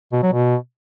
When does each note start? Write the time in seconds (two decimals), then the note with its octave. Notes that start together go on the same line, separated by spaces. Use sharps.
0.13 B2
0.23 F#3
0.33 B2